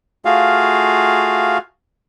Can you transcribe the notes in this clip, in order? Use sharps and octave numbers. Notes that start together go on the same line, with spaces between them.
A3 F4 F#4 G#4 F5